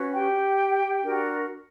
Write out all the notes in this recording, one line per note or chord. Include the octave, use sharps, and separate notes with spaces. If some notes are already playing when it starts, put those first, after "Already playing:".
Already playing: C#4 F#4 B4
G4 G5
D4 F#4 A#4